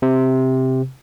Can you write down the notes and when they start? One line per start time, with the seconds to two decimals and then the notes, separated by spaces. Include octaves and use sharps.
0.02 C3